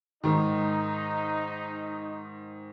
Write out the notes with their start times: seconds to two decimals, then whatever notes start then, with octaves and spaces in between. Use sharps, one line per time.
0.24 G#2 D#3 D#4